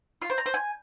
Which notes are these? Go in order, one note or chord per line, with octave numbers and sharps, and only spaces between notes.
F4
C5
A#5
C5
G#5